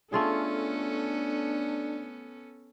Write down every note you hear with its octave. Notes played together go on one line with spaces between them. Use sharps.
A3 B3 C#4 D4 F4 G#4 A4